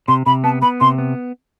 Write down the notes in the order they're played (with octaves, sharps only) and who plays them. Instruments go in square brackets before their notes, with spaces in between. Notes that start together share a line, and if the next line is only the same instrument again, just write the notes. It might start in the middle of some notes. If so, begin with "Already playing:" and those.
[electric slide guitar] C3 [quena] C6
[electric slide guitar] C3 [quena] B5
[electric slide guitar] B3 [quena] A5
[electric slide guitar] B3 [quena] B5
[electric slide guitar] C3 [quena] C6
[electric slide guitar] B3